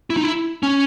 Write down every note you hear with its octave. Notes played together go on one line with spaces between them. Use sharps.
E4
D#4
E4
C#4